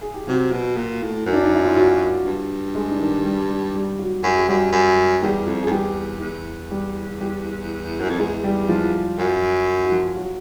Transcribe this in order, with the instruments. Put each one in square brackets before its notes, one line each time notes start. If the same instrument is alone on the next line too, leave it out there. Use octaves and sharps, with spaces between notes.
[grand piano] G#4
G4
[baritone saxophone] C3 [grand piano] F#3 F#4
[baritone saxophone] B2
A#2
A2
F#2
[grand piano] D4
D#4
E4
F4
F#3 F#4
[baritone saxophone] G2
[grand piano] G#3 G#4
D4
D#3 D#4
G3 G4
G3 G4
G3 G4
F#3 F#4
[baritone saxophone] F#2 [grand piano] G4
[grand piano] G#4
[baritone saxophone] F#2 [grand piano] G3 G4
[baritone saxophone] F#2
[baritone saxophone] E2 [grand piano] G3 G4
[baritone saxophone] F2
[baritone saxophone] F2 [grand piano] G#4
[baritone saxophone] E2 [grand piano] G3 G4
[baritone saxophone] E2
[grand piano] G3 G4
G3 G4
[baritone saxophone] F#2
F2
[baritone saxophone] E2 [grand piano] G#3 G#4
[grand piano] G3 G4
F3 F4
[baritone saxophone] F#2
[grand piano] F#4
F3 F4
F#3 F#4